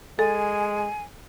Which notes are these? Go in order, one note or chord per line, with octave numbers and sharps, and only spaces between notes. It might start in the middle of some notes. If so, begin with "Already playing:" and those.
G#3 A4 G#5